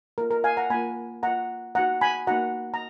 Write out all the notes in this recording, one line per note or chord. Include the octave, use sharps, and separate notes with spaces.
A#3 F4 A#4
A#4
F5 G#5
F#5 A#5
A#3 F4 G#5 B5
A#3 F4 F#5 A#5
A#3 D#4 F#4 F#5 A#5
G#5 B5
A#3 D#4 F#4 F#5 A#5
A#5